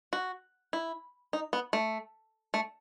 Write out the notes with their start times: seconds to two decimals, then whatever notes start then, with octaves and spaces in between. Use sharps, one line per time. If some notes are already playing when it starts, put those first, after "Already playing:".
0.13 F#4
0.73 E4
1.33 D#4
1.53 B3
1.73 A3
2.54 A3